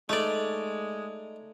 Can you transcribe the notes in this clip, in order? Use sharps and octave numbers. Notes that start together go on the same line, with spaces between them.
G#3 A3 D#4 D5